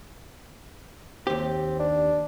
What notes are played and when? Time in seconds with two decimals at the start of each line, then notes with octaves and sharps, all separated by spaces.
1.27 D#2 C4 G4
1.79 D4